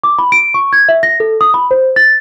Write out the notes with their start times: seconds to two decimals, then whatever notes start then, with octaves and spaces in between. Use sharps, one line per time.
0.04 D6
0.18 B5
0.32 D7
0.54 C#6
0.73 G#6
0.89 E5
1.03 A#6
1.20 A4
1.41 D#6
1.54 B5
1.71 C5
1.96 A6